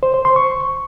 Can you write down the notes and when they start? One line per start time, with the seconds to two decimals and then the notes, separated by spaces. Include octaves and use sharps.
0.03 C5
0.14 C5
0.25 C6
0.36 C#6